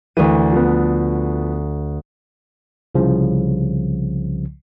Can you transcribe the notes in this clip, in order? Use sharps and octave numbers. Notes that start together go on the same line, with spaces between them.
D2 E3 D#7
F3 B3
C2 C#3 F3